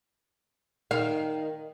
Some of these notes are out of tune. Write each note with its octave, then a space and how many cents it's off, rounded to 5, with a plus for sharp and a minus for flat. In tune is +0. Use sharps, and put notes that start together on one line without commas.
D#3 +0 F5 +0